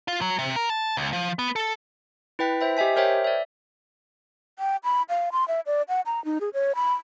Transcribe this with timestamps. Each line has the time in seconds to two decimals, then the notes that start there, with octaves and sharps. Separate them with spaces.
0.08 F4
0.21 F#3
0.39 C3
0.56 A#4
0.69 A5
0.97 C#2
1.13 F3
1.39 B3
1.56 A4
2.39 E4 B4 G5 B6
2.61 C5 E5 G5
2.77 G4 D#5 E5 G#5 B6
2.96 A#4 C5 C#5 E5 G5
3.24 D5 E5
4.59 G5
4.84 B5
5.09 F5
5.32 C6
5.48 E5
5.66 D5
5.89 F#5
6.06 A#5
6.25 D#4
6.41 G#4
6.54 C#5
6.75 B5